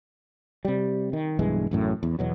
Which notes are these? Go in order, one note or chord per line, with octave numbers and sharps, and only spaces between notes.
C3 G3
D#3
B1 G2 E3 G#3
A1 F#2 A2
E2
E2 B2 F#3